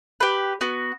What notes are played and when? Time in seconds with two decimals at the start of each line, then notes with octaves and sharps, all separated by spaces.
0.20 G4 B4
0.61 B3 F#4